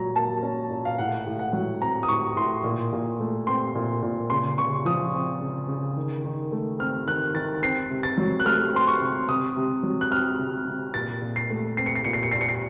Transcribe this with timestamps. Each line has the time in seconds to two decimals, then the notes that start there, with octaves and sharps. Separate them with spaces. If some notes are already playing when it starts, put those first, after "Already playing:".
Already playing: A#2 F#3 A#5
0.16 A#3 A5
0.43 C#4
0.70 A#2
0.85 F5
0.98 A2 F#5
1.26 A2
1.39 F#5
1.53 F#3
1.81 C4 A#5
2.03 D#6
2.08 A2 C#6
2.36 A2 C6
2.64 A#2
2.92 A#2
3.20 A3
3.47 C4 C6
3.75 A#2
4.02 A#2
4.30 C#3 C6
4.57 C#3 C#6
4.85 F3 D#6
5.14 C4
5.41 C#3
5.68 C#3
5.96 D#3
6.25 D#3
6.52 A3
6.79 C4 F6
7.06 D#3 F#6
7.35 D#3 A6
7.62 C4 C7
7.91 C3
8.03 A6
8.18 F#3
8.40 F#6
8.45 A3 F6
8.73 C4 C6
8.87 C#6
9.01 C3
9.28 C3 D#6
9.57 C3
9.83 F#3
10.01 F#6
10.11 C4 F6
10.39 C3
10.67 C3
10.94 A#2 A6
11.22 A#2
11.36 C7
11.50 A3
11.77 C4 C7
11.86 C#7
11.95 C7
12.04 A#2 C#7
12.13 C7
12.23 C#7
12.31 A#2 C7
12.41 C#7
12.49 C7